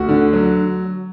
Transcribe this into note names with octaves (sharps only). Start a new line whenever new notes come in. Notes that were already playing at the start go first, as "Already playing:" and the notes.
Already playing: D2 F#4
D3
F#3